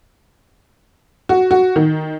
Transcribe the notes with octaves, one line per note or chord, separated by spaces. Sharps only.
F#4
F#4
D#3